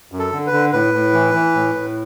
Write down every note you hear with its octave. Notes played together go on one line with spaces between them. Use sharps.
F#2
A4
D3
B4
D3
A2 B4
A2
E3
E3
A2
A2